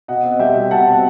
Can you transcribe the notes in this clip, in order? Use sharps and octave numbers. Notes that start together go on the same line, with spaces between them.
B2 D#5 F#5
C4
G3 E5 G5
B2
B2 F#5 A5
C4